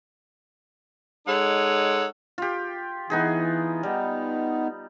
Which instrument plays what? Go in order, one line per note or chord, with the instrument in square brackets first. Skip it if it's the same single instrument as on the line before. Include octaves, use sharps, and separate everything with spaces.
[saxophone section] G#3 D#4 A4 C#5 F#5
[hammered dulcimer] F4 G4
[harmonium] E3 [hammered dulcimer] B3 D#4 G#4
[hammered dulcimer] G3 [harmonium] B3 D#4